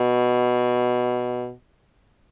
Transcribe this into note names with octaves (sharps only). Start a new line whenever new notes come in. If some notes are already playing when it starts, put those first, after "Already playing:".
Already playing: B2